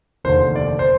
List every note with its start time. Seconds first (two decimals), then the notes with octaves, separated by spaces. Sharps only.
0.24 F1 D#2 D3 C5
0.56 D5
0.79 C5